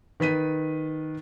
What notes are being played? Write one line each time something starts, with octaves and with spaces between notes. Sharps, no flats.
D#3 B4 B6 D#7